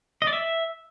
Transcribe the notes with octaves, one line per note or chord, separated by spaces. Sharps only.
D#5
D5
E5